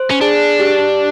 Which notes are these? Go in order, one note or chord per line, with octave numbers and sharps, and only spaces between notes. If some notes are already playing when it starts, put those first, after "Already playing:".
Already playing: C5
C#4
D4 G#4
G4